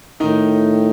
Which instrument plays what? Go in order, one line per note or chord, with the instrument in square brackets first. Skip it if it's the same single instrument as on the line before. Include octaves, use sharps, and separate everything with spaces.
[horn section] A2 [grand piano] D#3 D#4